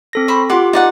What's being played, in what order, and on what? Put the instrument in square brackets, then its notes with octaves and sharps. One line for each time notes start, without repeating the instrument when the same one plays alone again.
[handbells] C4 A4 A#6
[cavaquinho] C5 B5 C#6
[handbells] F4 G4 [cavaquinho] F#5 C6 D6
[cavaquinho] D#4 D5 F#5